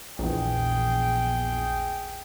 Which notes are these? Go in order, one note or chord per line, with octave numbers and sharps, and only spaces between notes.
A#1 E2 G#4 G5